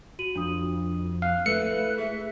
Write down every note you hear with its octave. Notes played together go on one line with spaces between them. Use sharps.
F#4 D#7 F#7
F2 D4 D#6
F5 F#6
A3 E4 B4 E5 E6 C#7
G#4 E5